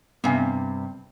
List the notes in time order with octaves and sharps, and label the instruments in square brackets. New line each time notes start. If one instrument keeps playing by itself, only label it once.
[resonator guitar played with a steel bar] G2 C3 [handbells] B3 G#5